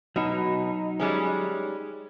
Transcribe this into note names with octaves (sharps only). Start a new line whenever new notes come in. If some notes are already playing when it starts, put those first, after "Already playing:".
B2 F#3 D#4
G3 G#3 C#4